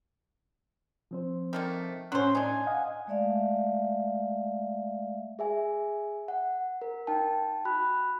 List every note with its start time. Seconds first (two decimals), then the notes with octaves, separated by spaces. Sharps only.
1.11 F3 C4 C5
1.53 D#3 A3 A#3
2.12 A2 F#3 C#4 C5 C6 F#6
2.35 D4 D#4 G#5
2.67 D#5 F5 F#5
3.07 G#3 A3 D5 E5 F5
5.39 G#4 E5 G#5
6.28 F#5
6.82 A#4
7.07 D#4 G5 A5
7.65 F#4 B5 F#6